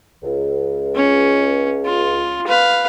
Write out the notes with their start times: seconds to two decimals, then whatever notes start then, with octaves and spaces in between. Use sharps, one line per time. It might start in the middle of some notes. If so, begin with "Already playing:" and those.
0.23 C#2
0.96 C#4
1.86 F4
2.47 B4 F5